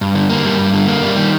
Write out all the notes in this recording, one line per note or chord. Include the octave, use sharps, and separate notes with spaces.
G2
D3
A#3
G3
G2
D3
A#3
G3
D#3